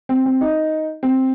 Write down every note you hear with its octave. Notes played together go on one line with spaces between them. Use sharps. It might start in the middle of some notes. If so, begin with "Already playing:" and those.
C4
C4
D#4
C4